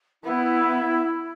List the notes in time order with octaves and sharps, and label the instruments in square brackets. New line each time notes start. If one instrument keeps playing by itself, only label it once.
[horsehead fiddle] B3 [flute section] E4